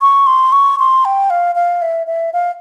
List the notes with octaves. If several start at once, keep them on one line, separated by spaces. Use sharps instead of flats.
C#6
C6
C#6
C6
G5
F5
F5
E5
E5
F5